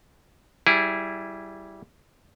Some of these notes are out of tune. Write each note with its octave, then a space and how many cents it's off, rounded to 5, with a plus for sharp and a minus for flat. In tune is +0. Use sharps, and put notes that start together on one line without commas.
G3 -15 E4 +0 G#4 -20